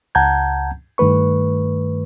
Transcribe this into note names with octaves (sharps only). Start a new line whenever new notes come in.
C#2 F#5 A5 A#5 G6 G#6
G2 D#3 A3 B4 C#6